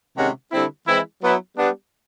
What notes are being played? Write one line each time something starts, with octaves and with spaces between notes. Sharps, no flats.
C3 D#3 G#3 C#4 F#4
D3 G3 C4 E4
E3 G#3 C4 E4
F#3 B3 E4
G3 B3 D4